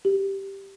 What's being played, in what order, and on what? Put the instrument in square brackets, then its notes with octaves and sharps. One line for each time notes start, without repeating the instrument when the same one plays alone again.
[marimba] G4